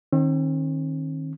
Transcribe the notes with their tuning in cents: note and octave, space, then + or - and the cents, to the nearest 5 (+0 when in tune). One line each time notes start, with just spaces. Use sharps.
D#3 +0 C4 +45